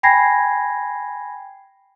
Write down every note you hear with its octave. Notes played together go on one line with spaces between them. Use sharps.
G5 G#5 B5 G#6 A#6 C7